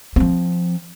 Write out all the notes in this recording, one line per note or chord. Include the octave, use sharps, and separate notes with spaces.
F3 C4